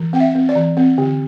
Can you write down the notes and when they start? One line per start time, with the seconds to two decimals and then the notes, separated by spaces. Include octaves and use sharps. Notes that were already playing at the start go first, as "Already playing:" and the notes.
Already playing: E3
0.13 C4 G5
0.20 E5
0.35 C4
0.49 D5
0.56 E3
0.77 C4
0.98 D3